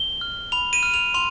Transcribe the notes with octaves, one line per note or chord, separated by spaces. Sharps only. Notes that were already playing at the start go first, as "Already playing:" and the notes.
Already playing: G7
F6
B5 F7
D#7
F6
F7
C6 F7